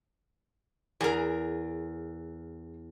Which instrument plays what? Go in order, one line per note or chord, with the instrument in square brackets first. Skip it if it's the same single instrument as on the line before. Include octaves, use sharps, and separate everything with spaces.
[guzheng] E2 [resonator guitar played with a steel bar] G#4 A#4